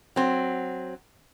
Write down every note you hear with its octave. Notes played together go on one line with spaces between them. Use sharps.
F#3 C4